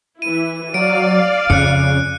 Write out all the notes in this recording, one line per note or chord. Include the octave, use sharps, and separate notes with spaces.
E3 E4 D#7
F#3 D5 F5 D7
F2 C#3 F#6 C#7